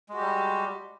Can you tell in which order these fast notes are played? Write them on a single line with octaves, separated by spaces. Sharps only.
G#3 F#4 G4 G3